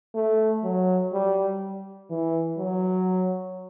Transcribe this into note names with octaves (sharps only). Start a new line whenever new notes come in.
A3
F#3
G3
E3
F#3